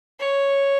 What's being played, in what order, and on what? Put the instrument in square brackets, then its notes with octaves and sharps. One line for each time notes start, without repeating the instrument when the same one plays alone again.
[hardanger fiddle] C#5